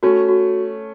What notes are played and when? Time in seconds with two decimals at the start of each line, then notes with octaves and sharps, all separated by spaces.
0.03 A3 C#4 F#4
0.29 F#4